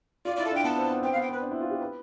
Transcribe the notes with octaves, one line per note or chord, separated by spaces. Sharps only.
F4 D5
E4 D5
A4
D4 G5
B3 A5
C4
B3
C4 G5
F5
B3
G5
C4 B4
D4
E4
F4
G4
B4